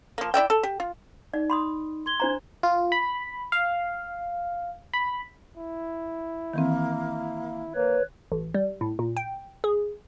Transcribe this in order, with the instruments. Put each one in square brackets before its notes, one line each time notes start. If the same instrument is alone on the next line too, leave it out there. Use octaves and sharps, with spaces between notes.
[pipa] F3 A#3
E4 D5 E5 G5
A4
G4
F4
[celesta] D#4 [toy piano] D5
[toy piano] B5 C6 D#6
[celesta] C6 G#6 G7
[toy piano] D4 C5 A#5
[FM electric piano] F4
B5
F5
B5
[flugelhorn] E4
[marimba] D#3 E3 C4 [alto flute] A#3
[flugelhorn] A#3 [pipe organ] B4 C#5
[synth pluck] A1
G3
A2
A#2
G5
G#4